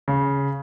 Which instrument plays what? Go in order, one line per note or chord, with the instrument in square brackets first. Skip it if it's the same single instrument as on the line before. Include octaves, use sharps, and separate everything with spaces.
[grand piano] C#3